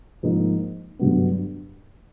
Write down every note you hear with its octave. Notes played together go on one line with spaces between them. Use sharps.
G#2 F3 A#3 D#4
G1 G2 D3 F#3 B3